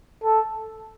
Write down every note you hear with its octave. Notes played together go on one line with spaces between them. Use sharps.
A4